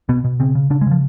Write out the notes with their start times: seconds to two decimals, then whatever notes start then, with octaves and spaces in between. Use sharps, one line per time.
0.09 B2 B3
0.24 B2
0.40 C#3 C4
0.55 C#3
0.70 C#3 D4
0.81 G#3
0.86 C#3 F3